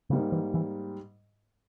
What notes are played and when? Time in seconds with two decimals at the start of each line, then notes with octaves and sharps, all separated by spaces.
0.10 G#2 C#3 G3 A#3
0.32 E3
0.54 E3